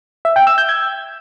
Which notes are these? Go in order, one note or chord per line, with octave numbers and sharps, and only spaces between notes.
E5
G5
E6
G6
G#6